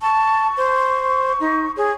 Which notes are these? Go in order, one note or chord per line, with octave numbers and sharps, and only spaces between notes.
A5 C#6
C5
D#4
G#4 C#5